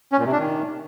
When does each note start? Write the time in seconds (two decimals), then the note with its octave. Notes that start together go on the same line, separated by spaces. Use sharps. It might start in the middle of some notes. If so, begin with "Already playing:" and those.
0.12 C#4
0.19 A#2
0.25 C3
0.32 D4
0.39 D#3